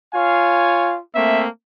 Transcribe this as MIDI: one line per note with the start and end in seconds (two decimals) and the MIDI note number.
0.14 0.99 65
0.14 0.99 73
0.14 0.99 77
0.14 0.99 80
1.15 1.47 57
1.15 1.47 58
1.15 1.47 60
1.15 1.47 76